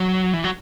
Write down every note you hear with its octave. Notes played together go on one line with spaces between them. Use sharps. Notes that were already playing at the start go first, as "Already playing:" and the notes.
Already playing: F#3
E3
F#3